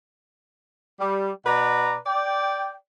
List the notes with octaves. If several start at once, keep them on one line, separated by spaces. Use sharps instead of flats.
G3
B2 B4 D5 A#5
D5 G5